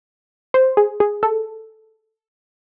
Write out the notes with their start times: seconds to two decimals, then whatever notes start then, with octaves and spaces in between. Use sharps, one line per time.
0.54 C5
0.77 G#4
1.00 G#4
1.23 A4